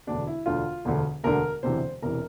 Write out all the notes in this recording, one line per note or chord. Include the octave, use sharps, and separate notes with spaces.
E1 D2 D3 D4
E4
E1 D2 D3 F4
E1 D2 D3
E1 D2 D3 A#4
E1 D2 C3 E3 C5
E1 C3 E3 A#4